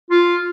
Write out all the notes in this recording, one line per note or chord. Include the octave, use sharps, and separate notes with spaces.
F4